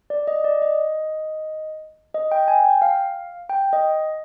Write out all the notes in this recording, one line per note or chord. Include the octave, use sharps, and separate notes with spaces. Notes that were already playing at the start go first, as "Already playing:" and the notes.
D5
D#5
D5
D#5
D#5
G5
G#5
G5
F5
G5
D#5